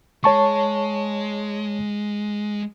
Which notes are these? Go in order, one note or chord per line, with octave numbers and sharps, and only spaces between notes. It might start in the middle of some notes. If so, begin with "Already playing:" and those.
G#3 C#5 A5 C#6